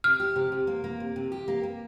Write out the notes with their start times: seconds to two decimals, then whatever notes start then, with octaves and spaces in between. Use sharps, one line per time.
0.04 C3 F6
0.20 G4
0.36 C3
0.52 C3
0.67 A#3
0.84 A#3
1.00 C3
1.16 C3
1.32 G4
1.48 A#3
1.63 A#3